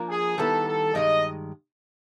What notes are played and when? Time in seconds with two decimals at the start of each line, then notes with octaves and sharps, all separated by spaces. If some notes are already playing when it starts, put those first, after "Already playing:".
Already playing: F3 A#3 D4 F4 A#4
0.10 G#4
0.38 D#3 G3 B3 E4 A4
0.66 A4
0.94 G2 D#3 G#3 D#5